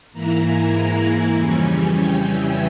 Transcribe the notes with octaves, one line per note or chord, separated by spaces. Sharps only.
G#2 E3 A#3 E4 A#5
G#5
F2 C#3 E3 G3 C#4 G#5
G5
E5